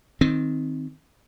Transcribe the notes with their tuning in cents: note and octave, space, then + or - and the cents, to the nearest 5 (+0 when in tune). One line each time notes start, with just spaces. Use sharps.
D#3 +5 C4 +0